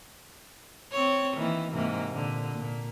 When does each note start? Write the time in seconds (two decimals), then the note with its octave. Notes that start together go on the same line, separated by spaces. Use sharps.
0.92 C4 C#5
1.36 D#3 E3 A#3
1.72 G#2 C3 A#3
2.12 A#2 D3
2.55 A#2 A#3